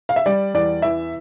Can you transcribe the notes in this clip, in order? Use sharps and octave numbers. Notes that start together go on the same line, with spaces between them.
F5
E5
G3 D5
E2 D5
E3 E5